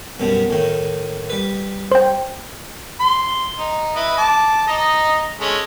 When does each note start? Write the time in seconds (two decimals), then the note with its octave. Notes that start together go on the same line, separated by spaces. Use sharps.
0.20 F#2 B2 G3
0.50 A2 D#3
1.30 G3 B4
1.92 C5 G5
3.00 C6
3.59 D#4
3.96 E4 B4 D#5
4.18 A5 D6
4.67 D#4 D#5
5.40 G#3 A3 C#4